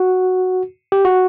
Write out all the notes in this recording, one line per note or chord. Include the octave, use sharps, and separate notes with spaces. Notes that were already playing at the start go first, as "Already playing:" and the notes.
Already playing: F#4
G4
F#4